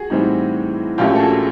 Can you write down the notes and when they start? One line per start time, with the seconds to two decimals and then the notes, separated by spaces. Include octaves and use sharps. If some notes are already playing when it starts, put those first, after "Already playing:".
Already playing: F#4 G#4
0.10 A2 E3 G3 C4 D#4
0.98 A#1 A#2 F#3 A3 C#4 F4 G4
1.15 A4
1.20 F#4 G#4